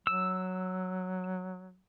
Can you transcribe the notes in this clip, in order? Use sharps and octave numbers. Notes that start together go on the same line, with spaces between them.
F#3 E6